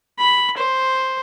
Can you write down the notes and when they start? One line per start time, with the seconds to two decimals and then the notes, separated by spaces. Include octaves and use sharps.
0.19 B5
0.57 C5